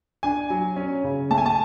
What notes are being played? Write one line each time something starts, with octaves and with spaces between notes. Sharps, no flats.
D4 G#5
F#3
C#4
C#3
A3 A5
G#5
A5